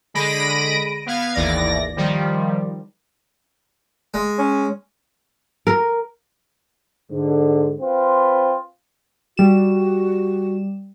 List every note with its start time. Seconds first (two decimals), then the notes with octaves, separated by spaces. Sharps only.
0.14 D3 G#3 B5 A#6 D7 D#7
1.06 B3 F5 G#6
1.35 G#1 D#2 E3 D5 A#6
1.96 D#3 F3 G3
4.14 G#3
4.38 C#4
5.67 A#4
7.10 G#2 D3
7.80 C4 F4 B4
9.37 G3 F#4 E7